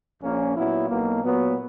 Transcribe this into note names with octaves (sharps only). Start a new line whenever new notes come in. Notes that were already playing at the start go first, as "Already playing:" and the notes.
A#1 A#2 A#3 C#4
A#2 F#3 B3 E4
B1 B2 A#3
A#2 F#3 B3